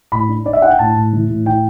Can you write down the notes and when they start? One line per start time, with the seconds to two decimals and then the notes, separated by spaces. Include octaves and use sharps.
0.12 A2 B5
0.28 D4
0.45 D4 D5
0.53 E5
0.62 D4 F#5
0.70 G5
0.79 A2 A5
0.96 A2
1.13 E3
1.29 A2
1.46 E4 G5